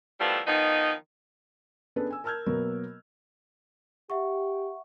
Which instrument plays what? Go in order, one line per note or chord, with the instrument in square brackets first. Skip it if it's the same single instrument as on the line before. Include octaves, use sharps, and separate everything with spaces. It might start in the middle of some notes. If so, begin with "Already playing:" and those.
[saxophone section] D#3 F3 G3 A3 B3 E4
D#3 F3 B3 D#4
[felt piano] B3 C#4 D4 G#4 A4 B4
G#5 E6
A#4 A5 E6 F6 G6 G#6
B2 F#3 A#3 B3 A#4
[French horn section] G4 [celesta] E5 F#5 C#6